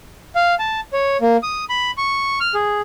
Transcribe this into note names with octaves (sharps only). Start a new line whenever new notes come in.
F5
A5
C#5
A#3
D#6
B5
C#6
F6
G#4